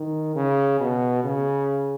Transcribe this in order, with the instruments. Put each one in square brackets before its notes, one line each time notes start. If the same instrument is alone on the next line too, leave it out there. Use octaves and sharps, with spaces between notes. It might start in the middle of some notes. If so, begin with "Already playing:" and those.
Already playing: [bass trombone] D#3
C#3
B2
C#3